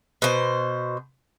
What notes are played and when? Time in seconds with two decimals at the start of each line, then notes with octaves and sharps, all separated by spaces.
0.22 B2 C5